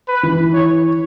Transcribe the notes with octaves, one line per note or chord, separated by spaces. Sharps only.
B4
E3 E4
C#5